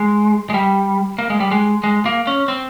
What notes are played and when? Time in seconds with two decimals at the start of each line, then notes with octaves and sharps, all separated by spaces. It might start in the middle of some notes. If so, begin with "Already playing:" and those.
Already playing: G#3
0.50 G#3
0.54 G3
1.18 A#3
1.30 G#3
1.40 G3
1.51 G#3
1.84 G#3
2.06 A#3
2.27 C#4
2.48 C4